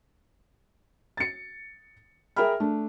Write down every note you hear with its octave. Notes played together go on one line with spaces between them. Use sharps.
A6 C#7
G#4 A#4 E5 G5 B5 F6
A3 D4